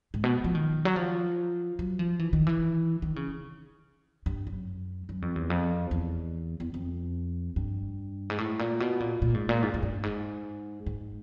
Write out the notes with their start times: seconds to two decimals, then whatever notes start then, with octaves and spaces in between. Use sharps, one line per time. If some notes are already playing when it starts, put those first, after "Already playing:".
0.14 G#2
0.24 B2
0.44 F3
0.55 D#3
0.85 F#3
0.96 F3
1.79 F#3
1.99 F3
2.19 E3
2.33 D#3
2.47 E3
3.02 D#3
3.16 C#3
4.26 G2
4.47 F#2
5.09 F#2
5.22 F2
5.36 E2
5.50 F2
5.91 E2
6.60 E2
6.74 F2
7.56 G2
8.30 G#2
8.38 A2
8.59 A#2
8.80 B2
9.00 A#2
9.22 A#2
9.34 G#2
9.49 A#2
9.63 G#2
9.74 G#2
9.83 G2
10.03 G#2
10.86 G#2